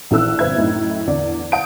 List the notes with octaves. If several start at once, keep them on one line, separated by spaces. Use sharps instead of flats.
A#1 E3 A4 E6 F#6
G1 C4 B4 E5 G#6
F#2 A2 A3 D#4 E4
E2 D3 D5
F#5 A5 D#6 G6 D7